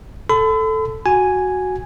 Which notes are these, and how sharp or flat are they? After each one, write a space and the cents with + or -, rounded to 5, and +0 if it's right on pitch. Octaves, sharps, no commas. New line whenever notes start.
A4 +0 B5 +45
F#4 +0 G#5 +0